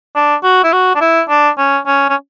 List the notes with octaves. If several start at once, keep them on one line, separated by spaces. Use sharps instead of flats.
D4
F#4
E4
F#4
D4
E4
D4
C#4
C#4
C#4